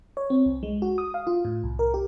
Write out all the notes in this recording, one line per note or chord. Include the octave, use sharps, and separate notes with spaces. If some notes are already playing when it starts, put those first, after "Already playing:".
C#5
C4
C2
G#3
F#4
D#6
F5
F4
A2
C2
A#4
G4